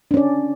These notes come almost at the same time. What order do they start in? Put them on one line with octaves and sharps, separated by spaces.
D4 C#4 D5